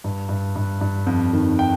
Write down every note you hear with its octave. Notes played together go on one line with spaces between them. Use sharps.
G2
G2
G2
G2
F2
D#3
G5